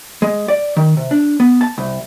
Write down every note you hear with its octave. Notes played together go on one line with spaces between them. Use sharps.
G#3
D5
D#3
C3
D4
B3
A5
C2